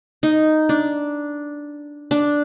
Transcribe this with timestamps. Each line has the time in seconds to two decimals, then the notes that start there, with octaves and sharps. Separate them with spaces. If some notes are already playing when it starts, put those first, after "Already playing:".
0.23 D#4
0.69 D4
2.11 D4